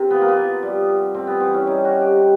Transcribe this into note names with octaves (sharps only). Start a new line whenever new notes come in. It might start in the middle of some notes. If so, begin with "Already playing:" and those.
Already playing: C3
F3 B3
A#3
B3
F3
G3
C3
C3 C4
B3
E3 C4
C#4
G3 D#4
F#4
C3
G4
C3